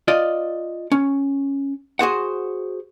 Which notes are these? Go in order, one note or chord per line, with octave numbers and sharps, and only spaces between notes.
F4 D5 D#5
C#4
F#4 G#4 C5 F#5